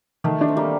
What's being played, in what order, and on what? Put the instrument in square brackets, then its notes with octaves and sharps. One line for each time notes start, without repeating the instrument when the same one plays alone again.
[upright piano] D#3 [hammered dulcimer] A3
[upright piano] D4
[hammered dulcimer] C4
[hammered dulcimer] G3 A#3 [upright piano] D4